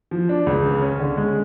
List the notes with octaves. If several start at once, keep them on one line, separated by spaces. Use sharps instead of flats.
F3
D4
C#2
C#3
C#4
D3
G#3